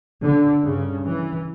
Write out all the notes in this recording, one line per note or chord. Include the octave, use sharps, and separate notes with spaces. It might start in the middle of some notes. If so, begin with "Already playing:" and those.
D3
G2 C#3
E3